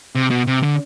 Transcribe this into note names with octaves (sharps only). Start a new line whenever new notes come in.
C3
B2
C3
D3